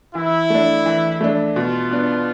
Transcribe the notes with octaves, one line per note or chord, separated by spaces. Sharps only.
E3 E4
A3 D4
E3
A3 D4
B2 F4
B3 D4